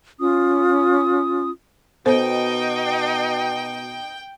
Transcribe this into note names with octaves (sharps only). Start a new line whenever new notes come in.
C#4 F4 D#6
B2 B3 D#4 A4 C5 G5